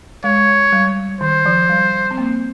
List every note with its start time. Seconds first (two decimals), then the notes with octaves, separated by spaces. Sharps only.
0.24 G#3 C#5
0.72 G3
1.21 D#3 C5
1.46 F3
1.69 G3
2.11 C4
2.18 A#3